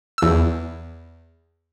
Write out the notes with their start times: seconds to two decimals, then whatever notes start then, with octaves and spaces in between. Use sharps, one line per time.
0.18 E2 E6